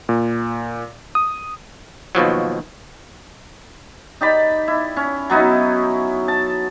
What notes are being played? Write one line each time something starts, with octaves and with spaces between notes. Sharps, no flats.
A#2
D#6
D#2 B2 F3 F#3
D#4 G4 D5 B5
E4
C#4
F#3 B3 D#4 E4
A5